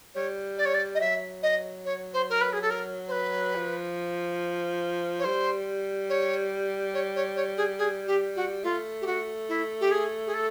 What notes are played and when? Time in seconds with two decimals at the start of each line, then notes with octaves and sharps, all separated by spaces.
0.15 G3 C#5
0.58 D5
0.65 C#5
0.74 D5
0.95 D#5
1.00 F#3 E5
1.43 D#5
1.85 C#5
2.13 C5
2.30 A#4
2.41 B4
2.53 G#4
2.62 A4
2.70 A#4
3.08 C5
3.12 B4
3.55 F3
5.19 C#5
5.24 G3 C5
6.09 C#5
6.94 C#5
7.16 C#5
7.36 C#5
7.57 G#4
7.79 G#4
8.07 G4
8.36 F#4
8.64 A3 F4
9.01 G4
9.06 F#4
9.49 E4
9.81 G4
9.91 G#4
10.27 G#4
10.34 A4